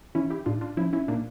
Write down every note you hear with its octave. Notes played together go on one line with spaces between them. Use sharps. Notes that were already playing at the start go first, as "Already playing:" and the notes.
E3 C#4 E4
E4 G4
A2 D4 F4
D4 F4
F3 C#4 E4
C#4 E4
A#2 A#3 D4